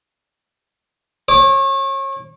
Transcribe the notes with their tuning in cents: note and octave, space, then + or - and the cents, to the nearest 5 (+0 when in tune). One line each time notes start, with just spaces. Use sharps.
C#5 -35 D6 -15